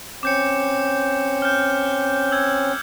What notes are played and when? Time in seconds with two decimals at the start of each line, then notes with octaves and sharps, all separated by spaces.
0.23 C4 C#4 D6 G6 C#7
1.42 F6 G6
2.32 E6 G#6